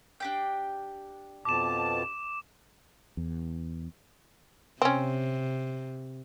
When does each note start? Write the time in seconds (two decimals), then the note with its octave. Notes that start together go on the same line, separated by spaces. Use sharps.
0.20 D4 G4 G5
1.45 F2 B2 A5 D6 E7
3.17 E2
4.82 C3 C4 C#4